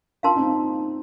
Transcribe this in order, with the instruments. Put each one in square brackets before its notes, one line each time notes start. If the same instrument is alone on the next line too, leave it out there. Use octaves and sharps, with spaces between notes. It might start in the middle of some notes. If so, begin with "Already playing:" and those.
[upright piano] D4 F4 [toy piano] A#4 F5 A5 C6
[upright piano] C4 D#4